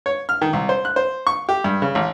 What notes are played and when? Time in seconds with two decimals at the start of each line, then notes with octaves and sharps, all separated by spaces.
0.06 C#5
0.29 F6
0.42 D#3
0.53 C2
0.69 C5
0.85 F#6
0.96 C5
1.27 C#6
1.49 G4
1.64 G2
1.82 C#3
1.95 A1